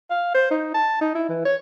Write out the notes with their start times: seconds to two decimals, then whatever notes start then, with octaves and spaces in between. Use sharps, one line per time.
0.10 F5
0.34 C5
0.51 D#4
0.74 A5
1.01 D#4
1.15 E4
1.29 E3
1.45 C#5